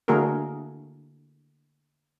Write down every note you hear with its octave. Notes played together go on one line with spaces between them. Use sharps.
D3 A3 A#3 F#4 G#4 A#4